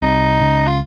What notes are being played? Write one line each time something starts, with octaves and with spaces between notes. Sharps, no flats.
C2 C3 D#4
C#2 C#3
F4